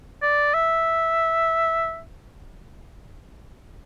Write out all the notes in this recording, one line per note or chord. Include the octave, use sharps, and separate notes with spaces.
D5
E5